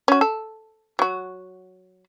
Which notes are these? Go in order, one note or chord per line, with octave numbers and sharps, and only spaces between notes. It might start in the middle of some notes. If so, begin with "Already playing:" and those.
C#4 F#4
A4
F#3 F#4